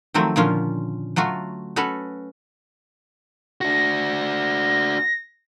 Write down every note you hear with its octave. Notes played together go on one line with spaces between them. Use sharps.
D#3 F3 F#3 A3 C4
A#2 D3 D#3 F3 C#4 F4
F#3 A3 F4 F#4
C#4 F#4 A4 B4
D4 F#4 A#6